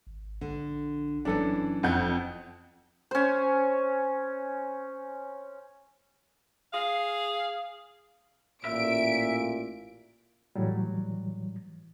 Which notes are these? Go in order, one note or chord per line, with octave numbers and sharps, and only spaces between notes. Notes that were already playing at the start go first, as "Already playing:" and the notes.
G#1
A#1 D3
F1 F#2 E3 C#4 D4 A4
F2 F#5 G6
C#4 C5
G#4 F5
A1 A#2 E5 D7
A2 E3 F#3 G3